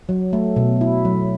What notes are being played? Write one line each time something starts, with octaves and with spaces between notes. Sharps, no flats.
F#3
A3
B2
E4
F#3